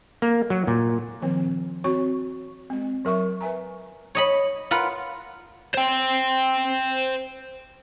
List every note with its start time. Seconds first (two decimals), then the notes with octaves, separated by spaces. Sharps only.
0.22 A#3
0.50 F#3
0.67 A#2
1.22 D#3 F3 C4
1.84 C4 F#4 C#5 C#6
2.70 G#3 C4
3.05 F#3 A#4 E5 C#6
3.41 B4 E5 G#5 A#5
4.15 C#5 D#5 B5
4.71 F4 A#4 B4 F#5
5.74 C5 G5